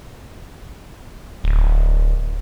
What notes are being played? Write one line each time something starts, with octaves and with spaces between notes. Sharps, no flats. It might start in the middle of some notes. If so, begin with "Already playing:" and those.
D1